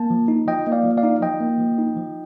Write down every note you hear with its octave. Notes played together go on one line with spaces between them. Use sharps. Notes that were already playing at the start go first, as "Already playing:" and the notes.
Already playing: A#3 A5
F3
D#4
F3 D#5 G5
A#3
D5 F5
F3
D5 F5
D#4
F3 D#5 G5
A#3
F3
D#4
F3